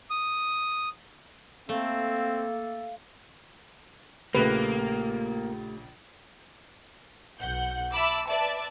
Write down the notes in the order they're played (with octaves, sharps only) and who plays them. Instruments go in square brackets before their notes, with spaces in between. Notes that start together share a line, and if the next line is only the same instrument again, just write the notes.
[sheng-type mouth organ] D#6
[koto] A3 [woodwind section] A#3 A4 [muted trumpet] C4 [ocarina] F5
[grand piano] A#1 C#3 [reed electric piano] A3 G4 [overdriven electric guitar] A#3 [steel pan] B4
[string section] B1 F#5 G6
E5 A5 B5 D6 E6
B4 D5 E5 A5